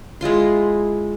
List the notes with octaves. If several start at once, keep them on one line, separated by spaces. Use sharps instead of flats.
G#3 E4 F4 C6